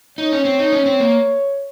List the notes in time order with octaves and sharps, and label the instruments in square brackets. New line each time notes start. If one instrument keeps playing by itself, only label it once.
[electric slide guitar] D#4 [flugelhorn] C#5
[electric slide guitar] C#4
C4
D#4
C#4
C4
A#3